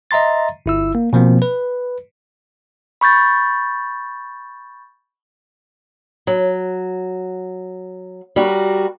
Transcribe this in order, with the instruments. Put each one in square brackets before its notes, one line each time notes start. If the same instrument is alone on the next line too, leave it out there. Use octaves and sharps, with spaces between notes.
[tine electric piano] D#5 E5 A#5 C6 A6
G1 E4 E6
A#3
B2 F3 A#3 C4
B4
[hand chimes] B5 C#6 G6 A6
[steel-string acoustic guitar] F#3
G3 F#4 A#4